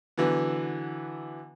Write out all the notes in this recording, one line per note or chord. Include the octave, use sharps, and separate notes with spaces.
D3 E3 F#3 B3